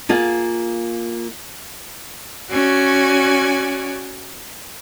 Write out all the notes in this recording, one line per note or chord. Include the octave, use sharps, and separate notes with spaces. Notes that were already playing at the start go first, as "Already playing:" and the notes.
A#3 F4 G#4 F5
C#4 F#4 D5 G#5